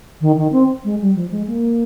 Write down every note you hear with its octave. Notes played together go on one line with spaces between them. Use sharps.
D#3
D#3
C4
G#3
G3
F3
G#3
A#3